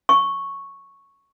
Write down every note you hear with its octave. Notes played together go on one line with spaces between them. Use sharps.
C#6